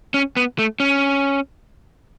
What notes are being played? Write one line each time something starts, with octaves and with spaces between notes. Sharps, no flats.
C#4
B3
A3
C#4